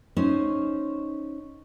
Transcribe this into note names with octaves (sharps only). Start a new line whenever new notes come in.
C#4 D#4 C5